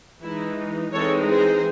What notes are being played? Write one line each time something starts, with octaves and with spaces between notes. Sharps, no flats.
E3 G#3 D#4 E4
E3 G#3 C4 D#4 A4 C#5
G#4 C5